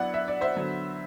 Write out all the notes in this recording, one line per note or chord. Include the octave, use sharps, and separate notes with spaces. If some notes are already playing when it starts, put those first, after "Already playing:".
Already playing: F#3 B3 E4 D5 F#5
E5
D5
C5 E5
D3 F#3 B3